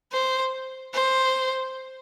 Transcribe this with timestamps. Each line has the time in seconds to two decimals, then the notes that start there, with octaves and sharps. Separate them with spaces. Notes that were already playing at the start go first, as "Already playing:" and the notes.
0.12 C5
0.93 C5